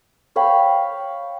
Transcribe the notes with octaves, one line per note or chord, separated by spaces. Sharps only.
C#5 F5 G5 B5